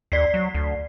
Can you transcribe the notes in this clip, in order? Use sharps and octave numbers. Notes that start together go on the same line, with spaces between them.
D#2 D5 B6 C7
F#3
D2